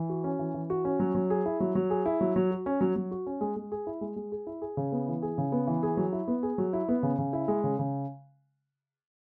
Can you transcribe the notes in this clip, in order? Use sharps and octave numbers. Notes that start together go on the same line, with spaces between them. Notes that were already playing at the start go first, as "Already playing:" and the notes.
Already playing: E3
F#4
C#4
E3
E3
F#4
C#4
F#3
F#3
G#4
E4
F#3
F#3
G#4
E4
F#3
F#3
F#4
C#4
F#3
F#3
F#4
C#4
G#3
G#3
G#4
E4
G#3
G#3
G#4
E4
G#4
C#3
B3
E3
G#4
C#3
B3
E3
G#4
F#3
E4
B3
G#4
F#3
E4
B3
C#3
C#3
E4
G#3
C#3
C#3